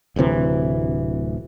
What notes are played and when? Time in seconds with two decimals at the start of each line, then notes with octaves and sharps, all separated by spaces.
0.16 D1 D2 C3 E3